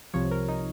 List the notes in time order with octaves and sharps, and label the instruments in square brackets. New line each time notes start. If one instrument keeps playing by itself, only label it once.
[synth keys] C2 C3 F3 C#5
A#4
D#4